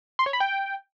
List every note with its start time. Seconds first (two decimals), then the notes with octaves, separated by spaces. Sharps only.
0.19 C6
0.26 C#5
0.33 B5
0.40 G5